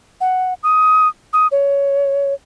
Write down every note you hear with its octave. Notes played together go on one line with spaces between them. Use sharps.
F#5
D#6
D#6
C#5